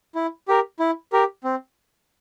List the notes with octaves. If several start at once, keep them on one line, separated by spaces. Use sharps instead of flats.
E4
G4 A#4
E4
G4 A#4
C4